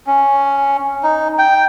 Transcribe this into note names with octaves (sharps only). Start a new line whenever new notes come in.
C#4
D#4
G5